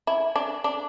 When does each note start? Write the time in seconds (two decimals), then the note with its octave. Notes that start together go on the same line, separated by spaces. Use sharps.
0.07 E4
0.36 D4
0.64 D4